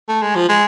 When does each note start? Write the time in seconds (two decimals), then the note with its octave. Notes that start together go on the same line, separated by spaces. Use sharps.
0.09 A3
0.22 G#3
0.36 F3
0.49 G#3